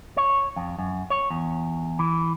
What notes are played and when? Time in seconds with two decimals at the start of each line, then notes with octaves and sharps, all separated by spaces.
0.17 C#5
0.56 F2
0.79 F#2
1.10 C#5
1.31 E2
1.99 E3